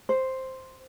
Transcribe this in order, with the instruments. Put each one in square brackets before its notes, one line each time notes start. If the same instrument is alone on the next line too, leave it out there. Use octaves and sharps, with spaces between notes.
[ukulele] C5